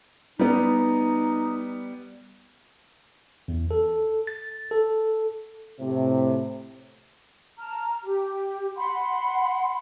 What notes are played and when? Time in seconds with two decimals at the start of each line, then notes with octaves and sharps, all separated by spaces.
0.39 G3 B3 D#4
3.48 E2
3.71 A4
4.27 A6
4.71 A4
5.80 A2 C3
7.58 A5 A#5 F6
8.03 G4
8.76 F#5 B5 C6